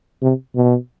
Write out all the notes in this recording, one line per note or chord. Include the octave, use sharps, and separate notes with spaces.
C3
B2